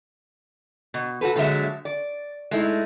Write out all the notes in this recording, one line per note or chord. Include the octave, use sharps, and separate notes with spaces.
B2
F#4 G#4 A4 B4
A#2 D3 F#3 G#3 E5
D5
G#3 A3 D#4 E4